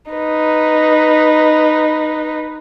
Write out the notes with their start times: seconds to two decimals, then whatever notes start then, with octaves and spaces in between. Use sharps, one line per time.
0.12 D#4 B4